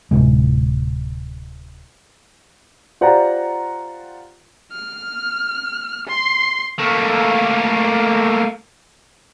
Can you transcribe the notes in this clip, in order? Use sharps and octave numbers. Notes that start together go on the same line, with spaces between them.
D1 E2 C3 G#3
F4 G4 C5 D5 F#5 A#5
F6
C6
A3 A#3